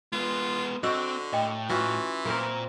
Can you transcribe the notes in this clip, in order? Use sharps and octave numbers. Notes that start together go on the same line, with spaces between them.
G#3 B3 F4
D3 C4 F#4 D#5 C#6 E6
A2 D#5 G5
E3 C#4 F4 F#4
A#2 A#3 C4 A#4